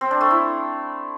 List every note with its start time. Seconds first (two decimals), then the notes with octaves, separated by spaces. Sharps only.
0.01 C4
0.11 D4
0.21 A3
0.30 E4